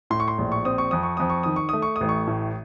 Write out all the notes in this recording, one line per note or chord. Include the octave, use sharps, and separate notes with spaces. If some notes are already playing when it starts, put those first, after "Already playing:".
A2 C6
C#6
C6
A#1
C#6
C4 D#6
C#6
F2 D#6
C#6
F2 D#6
C#6
D#3 D#6
C#6
A3 D#6
C#6
A1 D#6
C#6
A2